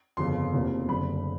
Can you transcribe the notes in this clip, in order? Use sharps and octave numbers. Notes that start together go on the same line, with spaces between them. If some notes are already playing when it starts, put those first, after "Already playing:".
G1 F2 C#3 C6
F1 E2 C3 F3 A#3
F#1 F#2 D3 G3 B5